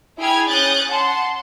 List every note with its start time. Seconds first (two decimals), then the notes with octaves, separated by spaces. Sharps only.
0.18 E4 G#4 G5 B5 F6 G#6
0.49 C#4 D#6 F#6 G6 A6
0.91 F#5 A5 C6